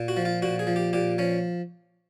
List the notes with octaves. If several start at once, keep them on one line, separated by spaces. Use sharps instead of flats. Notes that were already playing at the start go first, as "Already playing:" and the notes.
Already playing: A#2
F#4
F3
F4
A#2 F#4
G#4
F3
G4
A#2 G4
F3 C#4